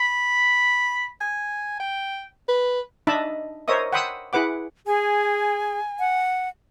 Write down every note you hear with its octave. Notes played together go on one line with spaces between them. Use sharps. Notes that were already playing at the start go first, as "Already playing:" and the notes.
B5
G#5
G5
B4
D4 D#4 D#5 E5 A5 B5
A#4 C5 C#5 D#5 E5 D#6
F#5 G5 B5 C6 D#6 E6
E4 G#4 B4 F#5 D6
G#4 G#5
F#5